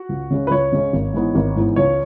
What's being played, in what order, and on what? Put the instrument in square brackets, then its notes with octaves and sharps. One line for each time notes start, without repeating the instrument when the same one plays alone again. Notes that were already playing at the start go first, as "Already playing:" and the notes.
Already playing: [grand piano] F#4 F#5
C#2
C#3 G#3 C#4
B4
C#2 C#5
C#3 G#3 C#4
G#1
G#2 E3 B3
G#1
G#2 E3 B3
C#2 C#5